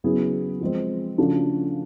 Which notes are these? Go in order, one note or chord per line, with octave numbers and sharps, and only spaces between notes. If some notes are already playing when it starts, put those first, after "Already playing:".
C#3 F#3 B3 E4 G#4
F3 G#3 C4
C#3 F3 A3 D4 F#4